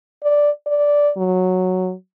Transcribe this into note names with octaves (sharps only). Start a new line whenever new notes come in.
D5
D5
F#3